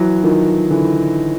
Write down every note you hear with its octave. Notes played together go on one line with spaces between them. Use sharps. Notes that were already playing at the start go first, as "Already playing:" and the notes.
Already playing: E3 F#3
D#3 F3
D3 E3